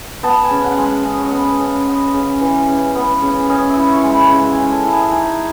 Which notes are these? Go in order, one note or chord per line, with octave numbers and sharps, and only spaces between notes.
B3 A5
G#5
C#3
F#5
G#3
C#3 D#5
C#5
D#5
B3
C#3
B3 D#5
C#3
E3
C#3
B3
C#3
C#4 D#5
E5
E4
C#6
G#3
B5
C#3
G#5
C#4
A4
E4
G#4
D#4 G#4